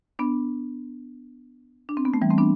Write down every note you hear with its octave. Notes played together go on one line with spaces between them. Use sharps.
B3 D4
D4
C4
B3
A3
E3 G3
A3 C4
B3 D4